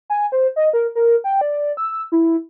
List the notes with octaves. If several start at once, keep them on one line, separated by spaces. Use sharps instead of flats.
G#5
C5
D#5
A#4
A#4
G5
D5
E6
E4